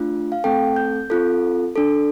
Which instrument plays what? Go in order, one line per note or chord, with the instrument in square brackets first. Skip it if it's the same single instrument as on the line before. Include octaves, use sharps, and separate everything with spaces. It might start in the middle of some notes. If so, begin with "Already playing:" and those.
Already playing: [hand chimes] A3 D4 F4
F5
A3 C4 A4 G5
G6
C4 F4 A4
D4 A4